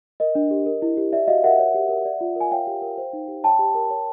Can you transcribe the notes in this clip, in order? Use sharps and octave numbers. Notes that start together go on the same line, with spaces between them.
A#4 D#5
D4
G4
A#4
E4
G4
D5 E5
F#4 D#5 F5
A#4 E5 F#5
C#5
G4
A#4
D5
F4
A#4 G#5
C#5 F5 G5
G4
A#4
C5
D#4
G4
C#5 G5 A5
G4
A#4
C#5